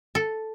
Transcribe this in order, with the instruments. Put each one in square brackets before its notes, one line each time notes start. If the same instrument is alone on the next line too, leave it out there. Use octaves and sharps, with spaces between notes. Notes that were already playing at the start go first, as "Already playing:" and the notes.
[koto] A4